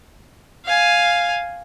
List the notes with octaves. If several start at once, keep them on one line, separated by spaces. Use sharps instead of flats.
F5 G#5